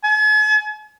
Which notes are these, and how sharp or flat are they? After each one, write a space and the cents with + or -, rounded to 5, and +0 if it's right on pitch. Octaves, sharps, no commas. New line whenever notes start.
G#5 +45